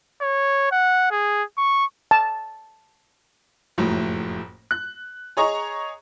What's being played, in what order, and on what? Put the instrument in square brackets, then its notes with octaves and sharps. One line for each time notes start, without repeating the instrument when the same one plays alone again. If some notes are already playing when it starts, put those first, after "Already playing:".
[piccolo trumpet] C#5
F#5
G#4
C#6
[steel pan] A5
[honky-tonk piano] F#1 F2 A2 F#3
F#6
G#4 C#5 D#5 A#5 C#6